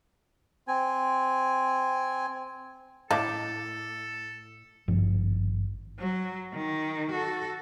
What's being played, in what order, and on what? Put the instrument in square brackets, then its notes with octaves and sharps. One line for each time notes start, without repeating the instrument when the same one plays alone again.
[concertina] C4 G#5
[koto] A2 [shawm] A4 [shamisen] D#5 F5 [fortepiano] A5 D6
[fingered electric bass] G#1 G2 F3
[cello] F#3
D#3
F#4 A4